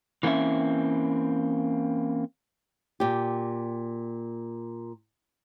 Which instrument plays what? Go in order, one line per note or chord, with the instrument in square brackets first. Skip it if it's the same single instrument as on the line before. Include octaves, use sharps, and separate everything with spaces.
[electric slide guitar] E3 A#3 C4 C#4 E5
[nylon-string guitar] A#2 G4